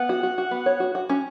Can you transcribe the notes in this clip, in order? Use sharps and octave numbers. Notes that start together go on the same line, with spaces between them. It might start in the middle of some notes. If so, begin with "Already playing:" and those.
Already playing: B3 F#5
F#4
F#4
F#4
B3
C#5
F#4
F#4
C#4